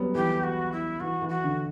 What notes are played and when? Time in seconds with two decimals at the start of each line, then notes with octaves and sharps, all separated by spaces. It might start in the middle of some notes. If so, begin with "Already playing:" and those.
Already playing: F#3 G3 B3
0.15 E3 G4
0.43 F#4
0.72 E4
1.00 E3 F#4
1.22 E3
1.29 F#4
1.44 D3